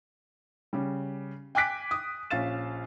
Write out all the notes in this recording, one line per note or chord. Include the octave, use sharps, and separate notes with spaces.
C#3 G3
G5 G#5 D6 F#6 B6 D7
D#6
A#1 C#4 F5 A6 E7